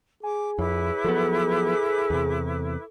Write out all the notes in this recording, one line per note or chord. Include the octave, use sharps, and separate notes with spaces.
G#4 G#5 D6
F2 E4 B4 C#5 D6
F3 F#3 B3 A4
E2 C3